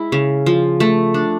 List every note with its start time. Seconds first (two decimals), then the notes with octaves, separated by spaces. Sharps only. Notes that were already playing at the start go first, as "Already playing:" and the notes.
Already playing: G#3 E4
0.12 C#3
0.46 F3
0.80 A3
1.14 D4